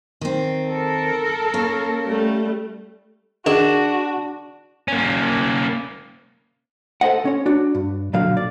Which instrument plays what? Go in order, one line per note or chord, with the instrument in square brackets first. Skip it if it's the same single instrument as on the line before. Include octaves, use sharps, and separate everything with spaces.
[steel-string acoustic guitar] D#3 C4
[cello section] A4 A#4
[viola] A#3 [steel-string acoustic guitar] C#4 F5
[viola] G3 A3
[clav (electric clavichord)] D#3 [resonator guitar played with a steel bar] D4 [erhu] F#4 [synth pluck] G#4 E7
[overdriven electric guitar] A#3 C#4
[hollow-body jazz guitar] A4 C5 D#5 F#5
C#4 C#5
D4 F#4
G2
B1 A#2 D3 F#3 F5
D5